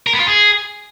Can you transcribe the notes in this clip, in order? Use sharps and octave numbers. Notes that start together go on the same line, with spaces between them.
A#4
B3
F4
G#4